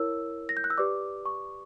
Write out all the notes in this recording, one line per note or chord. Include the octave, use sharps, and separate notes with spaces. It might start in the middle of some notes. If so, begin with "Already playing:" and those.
Already playing: E4 A#4 C#5 E6
A#6
G6
F#6
E6
G4 B4 D5 D6
C#6